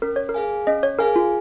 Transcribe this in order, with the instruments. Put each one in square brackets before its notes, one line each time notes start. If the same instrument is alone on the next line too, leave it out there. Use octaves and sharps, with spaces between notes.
[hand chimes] C#4 [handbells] A#4
[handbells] C#5
A#4
[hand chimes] G#4 F5 G#5
[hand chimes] C#4 [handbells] D#5
[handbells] C#5
[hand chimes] G#4 F5 G#5 [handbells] A#4
[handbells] F4